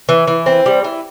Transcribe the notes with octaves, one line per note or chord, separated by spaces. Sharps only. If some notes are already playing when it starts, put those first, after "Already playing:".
E3
E3
C4
G3
E3